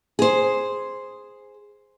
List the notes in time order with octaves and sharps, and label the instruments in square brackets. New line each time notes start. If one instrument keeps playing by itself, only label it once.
[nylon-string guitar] G#4 C5